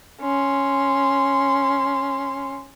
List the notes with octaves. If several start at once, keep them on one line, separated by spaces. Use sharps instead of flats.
C#4 C6